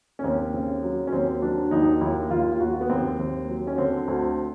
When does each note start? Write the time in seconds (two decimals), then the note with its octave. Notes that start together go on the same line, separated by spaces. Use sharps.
0.19 C#4
0.24 D#2 C4
0.54 C#3
0.83 F#3
1.07 C#4
1.12 D#2 C4
1.42 F#3 D4
1.71 D#2 D#4
2.01 D#2 E4
2.30 D#2 F4
2.52 F4
2.60 D#2 F#4
2.81 B3
2.89 D#2 C4
3.19 D#2
3.49 F#3
3.67 C#4
3.78 D3 C4
4.08 D2